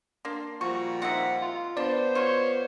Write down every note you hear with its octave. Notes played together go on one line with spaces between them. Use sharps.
A#3 D4 C6
A#2 F3 G3 F#4 C#6
C4 D#4 E5 F#5
F4
B3 D4 C5 D5
F4 F#4 C#5